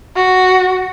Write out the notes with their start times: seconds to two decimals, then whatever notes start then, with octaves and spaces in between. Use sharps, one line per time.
0.16 F#4